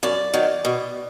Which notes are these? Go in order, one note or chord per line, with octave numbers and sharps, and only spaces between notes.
F#2 D5
D#3 F#3
B2